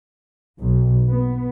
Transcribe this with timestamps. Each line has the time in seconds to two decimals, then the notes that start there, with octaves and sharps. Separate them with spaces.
0.57 B1
1.08 B3